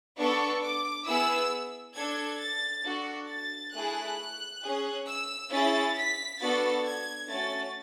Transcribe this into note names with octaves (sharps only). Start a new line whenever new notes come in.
B3 D4 A4 C#6
D6
B3 E4 G#4 E6
D4 A4 G#6
A6
D4 F#4 A4
A6
A3 E4 G#4 F#6
C#4 G#4
E6
C#4 E4 G#4 A6
B6
B3 D4 F#4 A4 A6
G#6
A3 C#4 F#4 A6